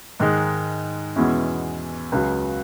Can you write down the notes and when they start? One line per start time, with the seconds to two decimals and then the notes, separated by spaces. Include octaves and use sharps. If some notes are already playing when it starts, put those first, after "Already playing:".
0.20 G#2 D#3 G#3
1.16 E2 B2 G#3 C#4 E4
2.12 C#2 C#3 F#3